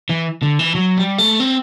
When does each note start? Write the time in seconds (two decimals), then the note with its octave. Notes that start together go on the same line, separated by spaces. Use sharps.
0.09 E3
0.43 D3
0.59 E3
0.75 F#3
0.97 G3
1.18 A3
1.40 C4